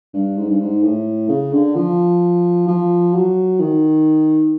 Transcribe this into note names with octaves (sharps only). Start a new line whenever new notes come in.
G2
G#2
G2
G#2
A2
C#3
D3
F3
F3
F#3
D#3